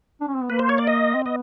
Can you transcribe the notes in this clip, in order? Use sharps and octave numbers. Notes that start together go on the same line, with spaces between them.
D4
C#4
C4
B3
A#3 B4
C5
C#5
D5
D#5
C4
B3 D#5